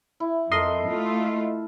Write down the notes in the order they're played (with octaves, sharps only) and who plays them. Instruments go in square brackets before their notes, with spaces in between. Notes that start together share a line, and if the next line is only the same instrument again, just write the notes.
[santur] E4
[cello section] F2 [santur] A4 A#4 [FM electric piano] D#5 C6
[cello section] A3 F4